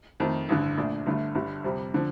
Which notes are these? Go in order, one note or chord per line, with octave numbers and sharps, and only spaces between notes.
F2 D#3 A3
A1 G2 D3
A#1 A#2 A3 D4
G1 G2 D3 A3
G1 G2 D3 G3
F2 C3 G3
D3 F3